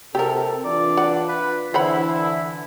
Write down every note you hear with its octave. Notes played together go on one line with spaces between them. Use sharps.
C3 G4 A4 A#4
E3 D4 F4 D5
F#5
B4
D3 E3 E4 C5 F#5 B5